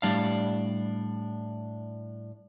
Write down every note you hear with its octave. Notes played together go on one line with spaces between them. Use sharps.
A2 G3 D4 F5